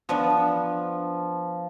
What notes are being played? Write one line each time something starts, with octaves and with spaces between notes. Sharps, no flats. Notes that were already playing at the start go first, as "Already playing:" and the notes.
F3 B3 D4